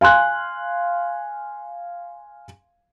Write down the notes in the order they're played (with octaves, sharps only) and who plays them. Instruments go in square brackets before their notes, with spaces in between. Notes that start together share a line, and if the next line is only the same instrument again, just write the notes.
[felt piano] F5 G#5 C6 F#6